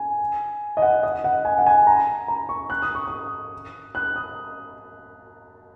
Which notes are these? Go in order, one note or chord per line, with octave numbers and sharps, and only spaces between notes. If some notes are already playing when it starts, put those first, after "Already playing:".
Already playing: G#5
D#5
F#5
D#5
F#5
G#5
F#5
G#5
A#5
A#5
C#6
F#6
D#6
C#6
D#6
F#6
D#6